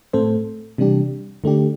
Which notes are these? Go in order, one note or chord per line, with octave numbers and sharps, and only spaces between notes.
A2 A3 C4 A4 C5
C3 E3 G3 D4 G4
D3 A3 D4 G4